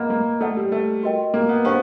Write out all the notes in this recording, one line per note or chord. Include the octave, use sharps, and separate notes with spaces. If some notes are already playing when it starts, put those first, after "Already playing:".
Already playing: A#3 B4 D#5 F#5 B5
A#3
A3 A4 D5 F#5
G3
A3
F#4 A#4 D#5 G5
A#3
B3
B3 D4 G4 C5 F5 A5